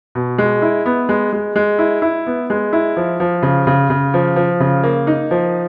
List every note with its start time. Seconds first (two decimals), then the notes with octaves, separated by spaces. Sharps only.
0.15 B2
0.38 G#3
0.62 E4
0.86 B3
1.09 G#3
1.33 G#3
1.56 G#3
1.79 E4
2.02 E4
2.27 B3
2.50 G#3
2.73 E4
2.97 F3
3.20 F3
3.43 C#3
3.67 C#3
3.90 C#3
4.14 F3
4.36 F3
4.60 C#3
4.83 A#3
5.07 D#4
5.31 F3